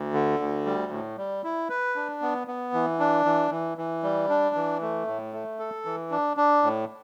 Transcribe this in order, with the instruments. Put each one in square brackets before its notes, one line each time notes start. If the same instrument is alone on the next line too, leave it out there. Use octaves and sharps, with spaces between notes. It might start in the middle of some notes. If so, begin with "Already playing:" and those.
Already playing: [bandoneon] D2
D3
D2
G3
A2
G3
E4
B4
D4
B3
B3
E3
D4
E3
E3
E3
G3
D4
E3
A3
A2
A3
A4
E3
D4
D4
A2